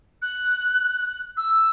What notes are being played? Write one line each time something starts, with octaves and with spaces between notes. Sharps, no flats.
F#6
E6